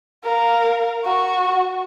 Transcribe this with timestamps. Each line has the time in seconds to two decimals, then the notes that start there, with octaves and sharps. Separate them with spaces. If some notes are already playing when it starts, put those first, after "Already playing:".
0.23 A#4 F5
1.05 F#4 C#6